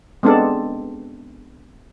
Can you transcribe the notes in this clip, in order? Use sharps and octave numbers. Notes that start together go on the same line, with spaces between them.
G#3 B3 C4 D4 A4 D5